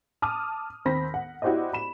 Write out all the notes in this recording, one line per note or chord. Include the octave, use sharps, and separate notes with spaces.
A5 D6 D#6 F6
D#2 C4 C5 B5 A#6 B6
F#5
E4 F#4 G4 C5 D5 D#5
B5 E7